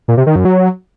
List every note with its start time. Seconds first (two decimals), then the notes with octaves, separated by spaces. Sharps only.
0.08 A#2
0.17 C3
0.27 D#3
0.36 F#2
0.45 F#3